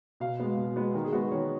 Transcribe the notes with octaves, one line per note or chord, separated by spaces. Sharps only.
B2 F5
G#3 B3
B2
G#3 B3
D#3 A#4
G#4
G#3 B3 F#4
G#4
D#3 C#5